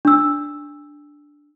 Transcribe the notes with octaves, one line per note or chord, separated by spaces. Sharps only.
D4 E6